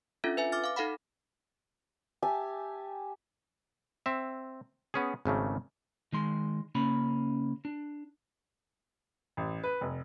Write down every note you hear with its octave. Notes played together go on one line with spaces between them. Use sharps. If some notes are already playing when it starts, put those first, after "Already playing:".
C#4 D4 F4 A4 E5
B4 E5 G#5
D6 F6 A6
F5 D6
D#4 A4 F5 F#5 B5
G4 E5 G#5 A5
C4 E5
B3 C#4 G#4
G#1 C#3 A3 A#3
D#3 G#3 C6
C#3 A#3 C#4 B5
D4
A1
B4
F1